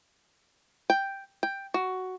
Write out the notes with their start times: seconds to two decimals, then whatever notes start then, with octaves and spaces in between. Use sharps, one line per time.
0.90 G5
1.43 G5
1.74 F#4